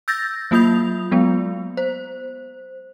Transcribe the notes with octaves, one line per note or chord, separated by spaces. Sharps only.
E6 G6 A6 A#6
F#3 A#3 F4 D#6 G6 F7
F#3 G#3 B3
C5